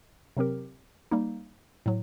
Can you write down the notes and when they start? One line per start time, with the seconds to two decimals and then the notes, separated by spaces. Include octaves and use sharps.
0.37 C3 F#3 C4 G4 A#4
1.11 G3 A#3 D#4
1.86 A2 F#3